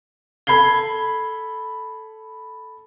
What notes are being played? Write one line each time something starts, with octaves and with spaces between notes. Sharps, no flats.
A4 B5 G#6 C7 G7